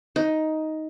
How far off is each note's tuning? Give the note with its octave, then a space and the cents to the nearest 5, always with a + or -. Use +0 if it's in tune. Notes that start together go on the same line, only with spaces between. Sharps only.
D#4 +10